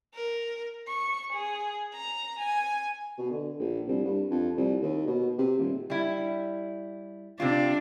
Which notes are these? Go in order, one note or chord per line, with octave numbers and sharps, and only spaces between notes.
A#4
C#6
G#4
A#5
G#5
B2
D3
A#1
C2
G2
F2
C2
D#2
B2
C3
D#1
G3 E4
C3 C4 D4 F4